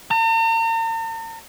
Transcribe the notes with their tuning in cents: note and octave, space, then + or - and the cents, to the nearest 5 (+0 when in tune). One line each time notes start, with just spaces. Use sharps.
A#5 -45